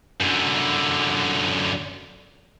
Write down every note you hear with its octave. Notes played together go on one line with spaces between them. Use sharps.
F#2 D3